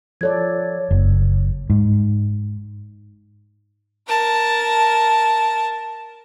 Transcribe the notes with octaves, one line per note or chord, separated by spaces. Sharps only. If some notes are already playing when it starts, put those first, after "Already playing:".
F3 A4 C#5 D5 G#6
F#1
G#2
A#4 A5